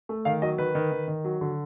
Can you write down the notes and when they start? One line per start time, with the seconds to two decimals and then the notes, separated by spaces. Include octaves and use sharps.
0.09 A3
0.25 D#3 F5
0.42 F#3 D#5
0.58 D#3 B4
0.75 D#3
0.92 D#3
1.08 D#3
1.24 F#3
1.41 D3